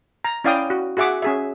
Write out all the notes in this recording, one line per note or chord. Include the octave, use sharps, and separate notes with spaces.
A#5
C#4 E4 D5 F5 G5 D#6
F#4
F#4 G#4 E5 F#5 D6
C#4 G#4 E5